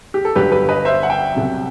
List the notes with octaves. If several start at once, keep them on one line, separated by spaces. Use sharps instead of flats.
G4
A4
G1 G2 F#3 G4 B4
G4 B4
B4 D#5
C5 E5
F#5
E5 G5
C2 C3 F#3